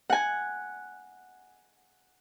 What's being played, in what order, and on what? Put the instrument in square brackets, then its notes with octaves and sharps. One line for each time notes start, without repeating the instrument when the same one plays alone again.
[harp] F#5 G#5